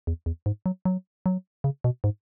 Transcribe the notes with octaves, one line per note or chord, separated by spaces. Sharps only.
E2
E2
G#2
F#3
F#3
F#3
C#3
B2
G#2